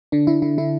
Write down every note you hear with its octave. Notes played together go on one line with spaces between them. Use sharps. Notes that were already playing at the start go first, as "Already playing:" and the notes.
D3 D4
D3 E4
D3 E4
D3 E4